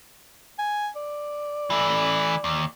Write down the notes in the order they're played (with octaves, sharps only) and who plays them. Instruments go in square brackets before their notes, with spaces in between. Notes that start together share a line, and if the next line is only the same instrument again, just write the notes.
[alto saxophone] G#5
D5
[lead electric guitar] E3 A3
D#2